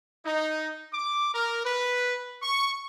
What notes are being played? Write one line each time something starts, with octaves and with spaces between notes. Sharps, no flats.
D#4
D6
A#4
B4
C#6